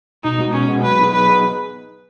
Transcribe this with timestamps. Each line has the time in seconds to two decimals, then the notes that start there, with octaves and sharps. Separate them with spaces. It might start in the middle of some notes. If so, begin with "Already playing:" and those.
0.24 B2 D#4
0.38 G#3 B3 F#4
0.53 B2 C#4
0.68 G#3 B3 F#4
0.83 F#3 B4
0.99 B3 D#4 G#4
1.13 F#3 B4
1.29 B3 D#4 G#4